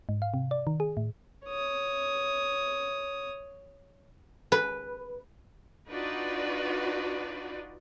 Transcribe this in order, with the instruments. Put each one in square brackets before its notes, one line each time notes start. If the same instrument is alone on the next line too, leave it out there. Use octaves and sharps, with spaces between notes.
[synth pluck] G#2
F5
C3
D5
D#3
G#4
A2
[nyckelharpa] C#5 D#6
[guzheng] B4
[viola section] D4 D#4 F4 F#4 B4 D5